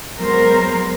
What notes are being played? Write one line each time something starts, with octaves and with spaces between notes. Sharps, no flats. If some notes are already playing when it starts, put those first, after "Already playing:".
F#3 G#3 B3 A#4 C5